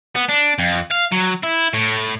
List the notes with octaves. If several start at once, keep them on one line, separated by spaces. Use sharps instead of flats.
B3
D4
F2
F5
F#3
E4
A2